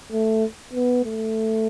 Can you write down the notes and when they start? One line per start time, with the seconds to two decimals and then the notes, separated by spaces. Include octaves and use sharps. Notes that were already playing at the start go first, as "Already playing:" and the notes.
0.12 A3
0.73 B3
1.05 A3